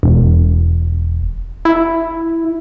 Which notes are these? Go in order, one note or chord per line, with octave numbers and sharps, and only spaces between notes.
E1
E4